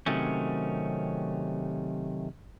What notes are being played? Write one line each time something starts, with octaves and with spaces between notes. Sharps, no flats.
C3 D#3 F#3 A3 C#4